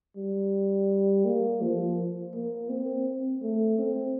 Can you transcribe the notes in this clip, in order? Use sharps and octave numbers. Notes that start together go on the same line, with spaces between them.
G3
A#3
F3
A#3
C4
A3
C4